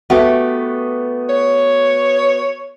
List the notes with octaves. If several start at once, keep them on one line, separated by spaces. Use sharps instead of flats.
A3 B3 F#4 G4
C#5